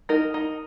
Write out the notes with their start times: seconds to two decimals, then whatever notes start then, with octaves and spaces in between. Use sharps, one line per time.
0.09 D#4 A#4
0.34 D#4